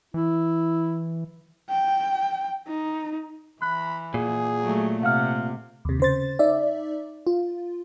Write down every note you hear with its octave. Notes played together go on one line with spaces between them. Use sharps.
E3 E4
G5
D#4
E3 B5 F#6
A#2 G#4
F#3 A3
C3 F5 F#5 F6
D#2 C3
C#3 C5 A6
D#4 D5 E5
F4